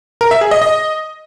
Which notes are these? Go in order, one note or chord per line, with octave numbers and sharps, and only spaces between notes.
A#4
E5
G#4
D#5
D#5